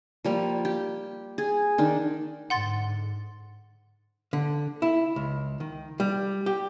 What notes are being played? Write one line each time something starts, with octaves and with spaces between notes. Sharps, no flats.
F3 G3 A#3
G4
G#4
D#3 D4
G#2 D3 F#5 C6 A6
D3
E4
C#2
D#3
G3
G4